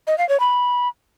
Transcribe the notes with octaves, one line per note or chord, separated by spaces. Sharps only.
D#5
F5
C#5
B5